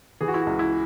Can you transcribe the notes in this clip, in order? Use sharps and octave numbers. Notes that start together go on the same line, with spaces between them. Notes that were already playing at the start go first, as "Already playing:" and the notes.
E3 G#4
F#4
E4
C#2 F#4
E4